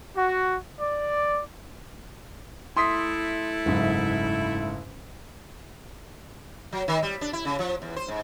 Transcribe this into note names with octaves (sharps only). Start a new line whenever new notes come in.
F#4
D5
A3 E4 C6 D#6 B6
F#1 G#2
F#3
D#3
G3
D4
E4
C#3
F3
E2
C5
G#2